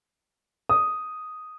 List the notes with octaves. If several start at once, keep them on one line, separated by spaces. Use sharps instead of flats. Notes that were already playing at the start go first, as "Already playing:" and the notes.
D#6